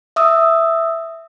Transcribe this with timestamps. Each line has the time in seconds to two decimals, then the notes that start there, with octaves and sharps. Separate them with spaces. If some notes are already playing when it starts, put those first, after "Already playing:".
0.16 E5 D#6 E6